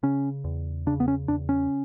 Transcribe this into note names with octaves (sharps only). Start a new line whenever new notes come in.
C#3 C#4
E2
C#3 D4
B3
C#4
E2 D4
C#4